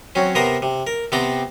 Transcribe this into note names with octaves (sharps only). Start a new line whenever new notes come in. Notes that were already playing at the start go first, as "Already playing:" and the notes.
F#3 C4 C#4
C3 B3 A#4 C5 A#5 D#6
C3
A#4
C3 B3 C4 D5 G5 A#5